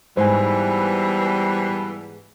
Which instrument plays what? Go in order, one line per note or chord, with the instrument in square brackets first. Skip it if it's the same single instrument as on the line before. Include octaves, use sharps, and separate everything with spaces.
[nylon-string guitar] G#2 [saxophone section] B2 E3 [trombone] G3 [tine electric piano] C5 G#5